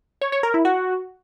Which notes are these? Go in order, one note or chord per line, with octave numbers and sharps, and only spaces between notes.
C#5
C#5
A#4
E4
F#4